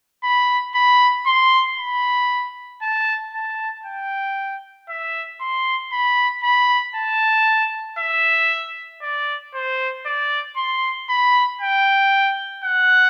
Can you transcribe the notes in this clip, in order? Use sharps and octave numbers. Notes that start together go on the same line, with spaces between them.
B5
B5
C6
B5
A5
A5
G5
E5
C6
B5
B5
A5
E5
D5
C5
D5
C6
B5
G5
F#5